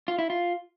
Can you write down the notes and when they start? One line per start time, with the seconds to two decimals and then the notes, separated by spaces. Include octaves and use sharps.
0.08 F4
0.19 E4
0.30 F4